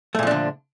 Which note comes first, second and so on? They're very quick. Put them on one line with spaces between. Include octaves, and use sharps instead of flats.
A3 A#2 F3 D4 D3